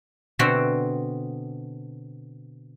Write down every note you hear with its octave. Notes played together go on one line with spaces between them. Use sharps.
B2 D3 C4 F#4 E5 G5